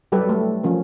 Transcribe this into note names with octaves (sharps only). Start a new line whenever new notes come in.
F#3 G3 G4 A4 B4
A3
F3 C#4 A#4